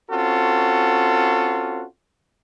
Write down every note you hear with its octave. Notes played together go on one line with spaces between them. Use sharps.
C4 C#4 F4 F#4 A4